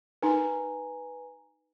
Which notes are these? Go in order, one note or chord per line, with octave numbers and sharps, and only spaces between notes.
D#4 A#4 B4 G#5 A#5